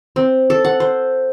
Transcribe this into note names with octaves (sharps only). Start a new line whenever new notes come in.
C4
A4
F#5
C5